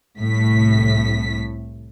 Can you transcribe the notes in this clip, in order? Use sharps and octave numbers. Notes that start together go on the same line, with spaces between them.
C2 A2 B6